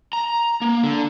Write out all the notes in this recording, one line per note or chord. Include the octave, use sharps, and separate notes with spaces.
A#5
A#3
D3